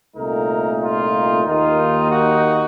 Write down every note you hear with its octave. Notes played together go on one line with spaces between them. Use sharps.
C2 A#2 A3 D#4 A#4
F4
D#2 D#3 A#3 D#4 F4
F#4